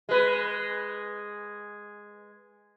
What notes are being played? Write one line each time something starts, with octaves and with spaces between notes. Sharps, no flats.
G#3 B4